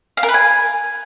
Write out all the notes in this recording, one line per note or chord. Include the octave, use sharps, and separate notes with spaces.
F5
A#4
B4
G#5